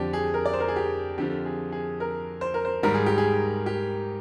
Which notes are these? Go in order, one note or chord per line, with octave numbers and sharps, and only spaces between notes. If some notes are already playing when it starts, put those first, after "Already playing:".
Already playing: F2 D3 F3 G4 D5
G#4
A#4
D5
C5
A#4
G#4
G4
F2 D3 F3 G4
G#4
G#4
A#4
C5
A#4
C5
G#2 D#3 G3 A#4
G#4
G4
G#4
G4